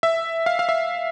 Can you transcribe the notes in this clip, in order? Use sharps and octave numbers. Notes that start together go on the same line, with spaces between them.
E5
F5
F5
E5